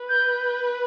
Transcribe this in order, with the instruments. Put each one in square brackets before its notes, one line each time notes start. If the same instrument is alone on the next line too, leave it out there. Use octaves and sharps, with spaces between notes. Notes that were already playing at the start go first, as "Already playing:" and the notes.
Already playing: [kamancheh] B4
[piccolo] G6